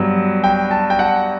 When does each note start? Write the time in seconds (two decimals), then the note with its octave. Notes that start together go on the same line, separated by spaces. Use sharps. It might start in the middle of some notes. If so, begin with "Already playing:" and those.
Already playing: G2 F#3 B3
0.44 G5
0.71 A5
0.90 G5
0.99 F#5